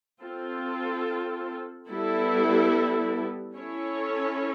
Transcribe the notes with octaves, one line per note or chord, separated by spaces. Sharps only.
C4 F4 A4
G3 B3 E4 A4
C#4 E4 A4 C#5